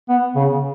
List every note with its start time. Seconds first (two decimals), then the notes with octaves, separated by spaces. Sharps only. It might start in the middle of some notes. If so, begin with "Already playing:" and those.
0.09 B3
0.36 C#3